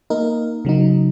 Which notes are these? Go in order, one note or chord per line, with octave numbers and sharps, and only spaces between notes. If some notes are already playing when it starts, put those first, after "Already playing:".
A#3 D#4 A#4
C#3 F#3 D#4